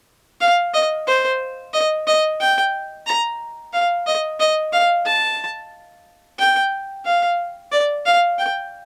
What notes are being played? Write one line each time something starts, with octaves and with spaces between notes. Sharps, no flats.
F5
D#5
C5
D#5
D#5
G5
A#5
F5
D#5
D#5
F5
A5
G5
F5
D5
F5
G5